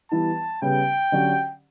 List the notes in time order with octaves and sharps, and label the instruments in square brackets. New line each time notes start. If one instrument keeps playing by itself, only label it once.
[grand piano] E3 G3 B3 E4 [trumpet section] A5
[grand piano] C#3 G3 B3 [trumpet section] G5
[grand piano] D3 F#3 C#4 G4 D5